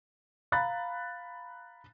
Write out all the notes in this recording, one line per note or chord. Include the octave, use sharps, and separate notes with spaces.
F5 A#5 B5 F#6 A6